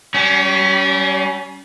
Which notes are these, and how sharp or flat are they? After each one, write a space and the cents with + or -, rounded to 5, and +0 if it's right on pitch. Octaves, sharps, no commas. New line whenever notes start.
G3 -35 C#4 +20